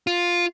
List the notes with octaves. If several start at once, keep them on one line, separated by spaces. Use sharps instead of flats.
F4